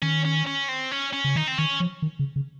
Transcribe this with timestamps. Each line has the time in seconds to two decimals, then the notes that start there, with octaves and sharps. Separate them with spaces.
0.02 D#3 C#4
0.25 C#4
0.47 C#4
0.69 C4
0.91 C#4
1.13 C#4
1.24 C#3
1.36 D#3 D#4
1.48 C4
1.58 D#3 C#4
1.80 F3
2.02 D#3
2.19 C#3
2.36 C#3